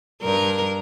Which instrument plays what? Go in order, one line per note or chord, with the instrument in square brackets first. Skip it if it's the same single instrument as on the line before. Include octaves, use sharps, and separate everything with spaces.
[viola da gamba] G2 A#4